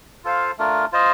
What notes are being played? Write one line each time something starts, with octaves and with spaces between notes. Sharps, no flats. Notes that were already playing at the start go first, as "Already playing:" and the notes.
F4 A4 C5 F5
A3 D4 F4 A#4
F4 C5 D#5